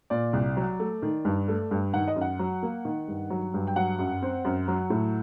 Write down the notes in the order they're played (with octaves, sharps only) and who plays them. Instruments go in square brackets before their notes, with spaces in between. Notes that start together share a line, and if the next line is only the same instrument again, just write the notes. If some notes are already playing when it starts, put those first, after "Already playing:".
[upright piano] A#2 D5
C2
F#3
A3
D#3
G2
A3
G2
D#3 F#5
D#5
F#2
F#5
F#3
A#3
D#3
G2
F#3
G2
G5
F#3 F#5
F#2
C4
F#2
F#3
A2